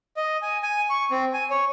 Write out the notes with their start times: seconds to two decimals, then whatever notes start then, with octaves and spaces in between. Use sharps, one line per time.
0.17 D#5
0.42 G#5
0.63 G#5
0.90 C#6
1.11 C4
1.33 G#5
1.50 C#5